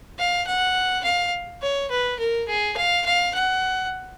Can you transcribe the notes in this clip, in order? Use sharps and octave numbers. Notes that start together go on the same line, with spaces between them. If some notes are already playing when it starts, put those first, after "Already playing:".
F5
F#5
F5
C#5
B4
A#4
G#4
F5
F5
F#5